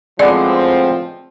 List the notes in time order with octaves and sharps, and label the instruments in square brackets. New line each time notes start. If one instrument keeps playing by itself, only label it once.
[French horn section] A2 F3 C4 [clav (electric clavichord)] G#3 B3 D4 [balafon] D5